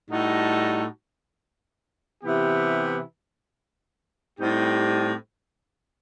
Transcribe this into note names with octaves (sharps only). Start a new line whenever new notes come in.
A2 G3 D#4 F#4 A4
C3 E3 B3 E4 G4
A2 G3 C4 D#4 G4